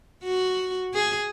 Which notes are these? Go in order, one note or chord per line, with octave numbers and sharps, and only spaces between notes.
F#4
G#4